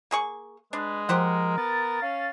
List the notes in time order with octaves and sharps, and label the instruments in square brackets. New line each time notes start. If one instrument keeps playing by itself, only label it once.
[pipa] A#3 G#4 C#6
[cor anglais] G#3 [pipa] D4 [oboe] B4
[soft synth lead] F3 [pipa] G4 C5 F#5 [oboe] A#4
[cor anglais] B3 [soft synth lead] A6
[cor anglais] C#4 [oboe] F5